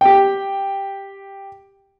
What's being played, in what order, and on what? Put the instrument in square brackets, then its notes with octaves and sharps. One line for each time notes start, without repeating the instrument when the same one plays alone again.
[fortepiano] G4 G5